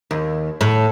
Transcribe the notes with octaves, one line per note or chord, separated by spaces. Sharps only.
D#2
A2